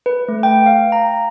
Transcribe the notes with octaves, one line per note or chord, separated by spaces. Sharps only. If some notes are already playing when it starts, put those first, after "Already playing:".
B4
A3
G5
F5
A#5